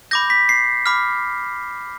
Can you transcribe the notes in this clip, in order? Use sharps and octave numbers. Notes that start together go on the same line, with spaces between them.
B5 D6 G6 A#6
B6
C7
B5 D6 F6